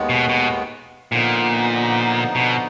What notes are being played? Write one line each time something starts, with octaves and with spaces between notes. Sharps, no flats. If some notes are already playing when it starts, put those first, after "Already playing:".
Already playing: D#2 D#3 G#3 B3
B2
B2
A#2 D3 F3 B3 D#4
B2